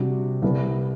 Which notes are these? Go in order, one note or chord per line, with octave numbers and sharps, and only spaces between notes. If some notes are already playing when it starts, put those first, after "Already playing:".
Already playing: C3 G3 D4 F#4
C2 C3 G3 B3